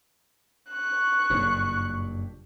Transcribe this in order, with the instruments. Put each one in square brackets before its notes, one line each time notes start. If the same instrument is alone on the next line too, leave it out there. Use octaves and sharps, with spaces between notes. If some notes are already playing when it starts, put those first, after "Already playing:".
[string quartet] C#6 F#6
[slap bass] F#1 G2 A#2